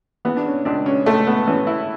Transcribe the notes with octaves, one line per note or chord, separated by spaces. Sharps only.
E3 B3
D4
C#4
C#2 D4
C#4
C#2 A3
B3
E3 C#4
E4